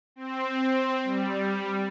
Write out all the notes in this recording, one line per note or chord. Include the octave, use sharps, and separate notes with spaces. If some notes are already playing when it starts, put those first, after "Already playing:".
C4
G3